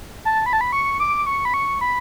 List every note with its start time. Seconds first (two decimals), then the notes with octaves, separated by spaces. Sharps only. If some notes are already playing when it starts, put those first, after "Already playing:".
0.25 A5
0.46 B5
0.53 A5
0.61 B5
0.73 C#6
1.00 D6
1.26 C#6
1.45 B5
1.54 C#6
1.81 B5